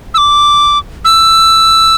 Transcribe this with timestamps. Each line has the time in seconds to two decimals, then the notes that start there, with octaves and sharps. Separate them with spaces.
0.14 E6
0.18 D6
1.05 E6